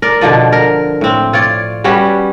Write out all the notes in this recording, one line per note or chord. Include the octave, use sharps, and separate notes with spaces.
A#4 D5
B2 D3 F3 D5
A#4
A2 C4
F4 C#5 D5
G3 B3 C#4 F#4